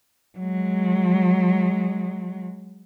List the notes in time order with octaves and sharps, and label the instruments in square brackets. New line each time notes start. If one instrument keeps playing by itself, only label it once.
[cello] F#3 G#3